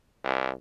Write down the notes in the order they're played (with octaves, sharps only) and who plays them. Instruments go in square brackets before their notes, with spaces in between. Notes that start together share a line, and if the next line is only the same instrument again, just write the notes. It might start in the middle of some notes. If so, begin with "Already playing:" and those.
[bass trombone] C2